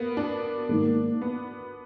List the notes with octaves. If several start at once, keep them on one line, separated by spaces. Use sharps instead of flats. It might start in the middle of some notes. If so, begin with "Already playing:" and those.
Already playing: A#3 B3
D4
G#2 D#3 A#3
B3